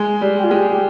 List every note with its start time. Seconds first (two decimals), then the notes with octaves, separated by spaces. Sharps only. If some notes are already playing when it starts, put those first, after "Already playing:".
Already playing: G#3
0.21 G3
0.36 G4
0.44 F4
0.51 G#3 G4
0.71 G4